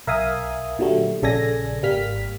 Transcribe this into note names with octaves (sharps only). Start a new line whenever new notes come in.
B1 A#4 E5 F5 G#5 D#6
A#2 D3 F#3 G3 A3
A#1 C#3 A4 D5 G#5 A#6
G#1 G3 A#3 F6 B6